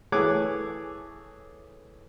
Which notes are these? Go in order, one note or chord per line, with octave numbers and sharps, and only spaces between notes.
E3 A3 G#4 C#5 D6 F#6